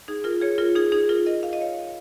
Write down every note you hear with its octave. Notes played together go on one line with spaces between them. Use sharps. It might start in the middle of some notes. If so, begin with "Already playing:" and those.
D#4 G#4
F4 A#4
G#4 C#5
F4 A#4
D#4 G#4
D#4 G#4
F4 A#4
A#4 D#5
F5
D#5
C#5 F5